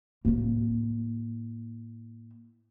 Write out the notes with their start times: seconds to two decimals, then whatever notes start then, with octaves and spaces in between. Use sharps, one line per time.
0.25 A2 A#3